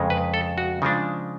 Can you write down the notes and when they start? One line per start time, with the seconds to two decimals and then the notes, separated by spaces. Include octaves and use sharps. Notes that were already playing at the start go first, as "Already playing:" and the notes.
Already playing: F2 C#3 G#3
0.10 B4
0.34 A4
0.58 F#4
0.82 C#3 F3 G#3 D4